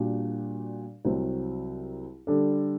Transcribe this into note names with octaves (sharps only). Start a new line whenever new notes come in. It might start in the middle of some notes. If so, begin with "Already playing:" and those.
Already playing: A#2 G3 D4 F#4
C2 C3 F#3 C4
D3 G3 D4 A4